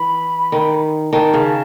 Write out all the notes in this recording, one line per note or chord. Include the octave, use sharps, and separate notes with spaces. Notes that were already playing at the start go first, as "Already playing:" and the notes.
Already playing: E3 B5
D#3
D#3 A5
C#3